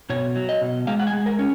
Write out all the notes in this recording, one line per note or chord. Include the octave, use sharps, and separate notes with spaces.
B2 C#5
F#3
D#5
B2
G#3 F5
F#5
G#5
G#3
A#4
C#4